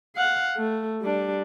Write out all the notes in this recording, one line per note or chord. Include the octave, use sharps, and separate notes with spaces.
F5 F#5
A3
G3 D4